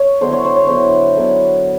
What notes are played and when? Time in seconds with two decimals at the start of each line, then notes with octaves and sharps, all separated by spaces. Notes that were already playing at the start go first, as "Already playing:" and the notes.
Already playing: C#5
0.21 D3 F#3 B3 E4 C5
0.33 C#5
0.45 C5
0.56 C#5
0.67 D3 F#3 B3 E4 C5
1.17 D3 F#3 B3 E4